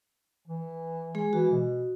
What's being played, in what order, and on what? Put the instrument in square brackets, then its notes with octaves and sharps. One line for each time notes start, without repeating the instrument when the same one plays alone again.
[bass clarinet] E3
[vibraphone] G#3 G#4
[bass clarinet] E3 [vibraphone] F#4
[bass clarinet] B2